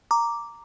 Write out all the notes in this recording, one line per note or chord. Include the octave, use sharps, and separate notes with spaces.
A#5 D6